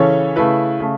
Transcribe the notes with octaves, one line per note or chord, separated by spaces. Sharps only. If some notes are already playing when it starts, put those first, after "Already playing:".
Already playing: C#3 E3 C#4 A4 C#5
C#3 A3 E4 B4
C#3 A3